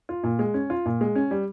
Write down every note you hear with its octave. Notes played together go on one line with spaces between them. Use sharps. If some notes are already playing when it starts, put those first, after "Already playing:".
F4
A#2
G#3
C#4
F4
A#2
G#3
C#4
G3